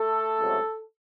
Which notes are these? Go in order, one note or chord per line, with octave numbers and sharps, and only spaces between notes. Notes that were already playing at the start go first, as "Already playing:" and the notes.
Already playing: A3 A4
C#2 C3 F#3 A3